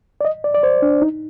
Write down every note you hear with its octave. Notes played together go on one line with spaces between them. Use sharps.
D5
D#5
D5
D5
C5
D4
D#4